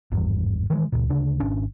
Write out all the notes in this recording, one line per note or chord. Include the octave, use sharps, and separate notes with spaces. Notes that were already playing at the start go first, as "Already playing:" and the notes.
G#1 E2 G2
D#3 E3 G#3
C#2 A#2
D2 C#3 D4
G#1 C#4 D4